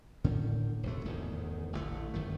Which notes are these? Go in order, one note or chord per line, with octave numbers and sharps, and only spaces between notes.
A2 D3 D#3 C#4
E1 D2 A3
D1 E2 G#2 D#3
A1 D3 D#3 A3
G1 F#2 D#3 A3